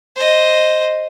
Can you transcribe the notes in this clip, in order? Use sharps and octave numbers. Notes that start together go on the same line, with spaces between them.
C5 D#5